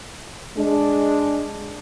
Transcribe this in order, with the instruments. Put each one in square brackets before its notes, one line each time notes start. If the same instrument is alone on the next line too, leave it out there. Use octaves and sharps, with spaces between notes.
[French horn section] G#3 D4